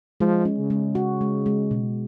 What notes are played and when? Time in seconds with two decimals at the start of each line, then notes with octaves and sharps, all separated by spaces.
0.20 F3 G#3
0.45 C#4
0.58 C#3
0.70 G#3
0.95 F#4
1.21 G#3
1.46 G#3
1.71 B2